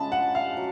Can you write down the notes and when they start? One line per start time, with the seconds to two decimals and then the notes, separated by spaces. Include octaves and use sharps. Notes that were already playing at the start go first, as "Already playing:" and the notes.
Already playing: C#3 F3 G#3 D4 A5 B5
0.12 F#5
0.35 F5
0.57 F#3